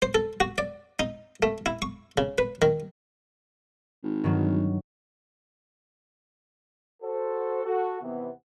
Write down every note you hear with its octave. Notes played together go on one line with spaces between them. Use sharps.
C5
A4
F#4
D5
D#4
A3
E4
C#6
C#3
B4
D#3
G#1
G2 D#3 F#3
F#4 A4 C5
F#4 A4
D#2 C3 E3 B3